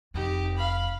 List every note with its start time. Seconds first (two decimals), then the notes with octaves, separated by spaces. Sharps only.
0.14 F1 F2 D#4 G4
0.57 F5 B5